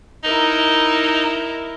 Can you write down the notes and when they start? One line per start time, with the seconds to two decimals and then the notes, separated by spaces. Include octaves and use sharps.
0.24 D#4 E4 A#4